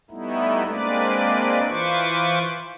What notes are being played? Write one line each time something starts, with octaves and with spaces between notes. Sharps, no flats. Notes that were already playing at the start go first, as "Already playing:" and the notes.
G3 A3 B3 D#4 E4
G#3 A#3 C4 D4 B4 D5
E3 F4 B4 C5 C#6 D6